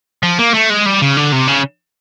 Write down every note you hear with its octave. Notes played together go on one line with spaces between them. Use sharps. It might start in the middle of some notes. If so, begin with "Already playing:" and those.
F3
A#3
A3
G#3
G3
C#3
D3
C3
C#3